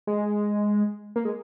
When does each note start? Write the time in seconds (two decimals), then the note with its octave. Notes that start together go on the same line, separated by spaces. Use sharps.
0.07 G#3
1.16 A#3
1.25 G#3